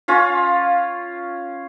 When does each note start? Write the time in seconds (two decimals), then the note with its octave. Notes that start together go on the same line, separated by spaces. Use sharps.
0.08 C#4 F4 F5